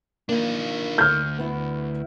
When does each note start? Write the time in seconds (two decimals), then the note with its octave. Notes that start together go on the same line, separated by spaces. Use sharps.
0.29 D#3 A#3 D4 F4
0.98 D2 F6 G6
1.38 B3 E4